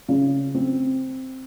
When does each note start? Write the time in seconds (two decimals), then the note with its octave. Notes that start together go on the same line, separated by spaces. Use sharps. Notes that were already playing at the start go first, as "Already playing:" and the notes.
0.09 C#3
0.54 C4